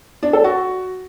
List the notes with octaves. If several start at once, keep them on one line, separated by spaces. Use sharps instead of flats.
D4
A4
F#4